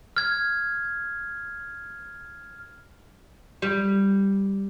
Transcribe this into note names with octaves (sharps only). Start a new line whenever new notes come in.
F6 G#6
G3